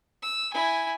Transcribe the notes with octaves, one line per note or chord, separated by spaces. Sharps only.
E6
E4 G#5